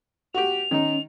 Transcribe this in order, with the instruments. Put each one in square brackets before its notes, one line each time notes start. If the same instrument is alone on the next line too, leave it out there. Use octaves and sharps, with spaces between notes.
[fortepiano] F#4 G4 [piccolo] F7
[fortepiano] D#3 D#4 [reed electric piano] C#4